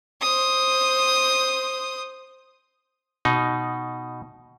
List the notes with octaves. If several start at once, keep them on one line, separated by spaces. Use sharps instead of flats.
C5 D#6
B2 D#4